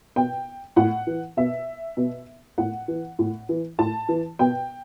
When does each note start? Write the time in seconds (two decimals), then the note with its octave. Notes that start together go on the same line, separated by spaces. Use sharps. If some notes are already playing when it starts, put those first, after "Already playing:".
0.16 B2 G5
0.76 A2 F#5
1.07 E3
1.37 B2 E5
1.97 B2
2.58 A2 F#5
2.88 E3
3.19 A2
3.49 E3
3.79 A2 A5
4.09 E3
4.39 B2 G5